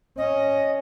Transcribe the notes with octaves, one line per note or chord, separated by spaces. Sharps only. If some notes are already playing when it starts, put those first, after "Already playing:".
C#4 D#5